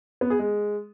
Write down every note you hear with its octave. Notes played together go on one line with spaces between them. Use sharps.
B3
G#4
G#3